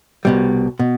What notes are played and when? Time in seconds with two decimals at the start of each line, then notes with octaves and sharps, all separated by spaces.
0.25 C2 B2 G3
0.79 B2